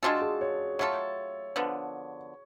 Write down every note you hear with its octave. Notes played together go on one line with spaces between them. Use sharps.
G#3 D4 F4 F#4 A4
G#4
C#5
F#3 A3 F4 A4 C#5
D3 F3 B3